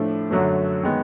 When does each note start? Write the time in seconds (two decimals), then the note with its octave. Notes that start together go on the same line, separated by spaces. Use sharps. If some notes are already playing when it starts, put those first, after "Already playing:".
Already playing: A2 F3 A3 D4
0.31 F#2 D3 F#3 A3
0.83 D#3 G#3 B3